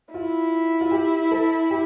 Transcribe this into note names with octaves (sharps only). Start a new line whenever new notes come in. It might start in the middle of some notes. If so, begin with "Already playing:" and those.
E4 F4
F4
G4
A4
G4